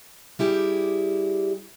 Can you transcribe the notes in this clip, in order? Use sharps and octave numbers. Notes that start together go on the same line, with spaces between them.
G3 E4 G4 G#4